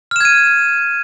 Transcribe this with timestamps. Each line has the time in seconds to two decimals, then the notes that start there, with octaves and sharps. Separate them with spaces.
0.11 F6
0.16 E7
0.21 G#6
0.25 D#7